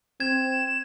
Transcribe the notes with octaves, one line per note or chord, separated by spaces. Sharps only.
C4 G#6 E7